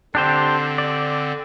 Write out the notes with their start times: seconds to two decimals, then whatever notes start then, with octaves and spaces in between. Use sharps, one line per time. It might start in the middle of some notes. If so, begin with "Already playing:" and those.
0.15 D3 C4 D4 G4 C5
0.78 D5